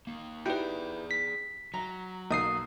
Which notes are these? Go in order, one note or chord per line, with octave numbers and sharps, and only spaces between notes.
A#3 D#4
D#4 E4 G4 G#4 B4 D5 G5
B6
F#3 A#5
B1 A#3 D#6 C7